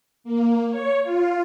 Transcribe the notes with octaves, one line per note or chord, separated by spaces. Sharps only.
A#3
C#5
F4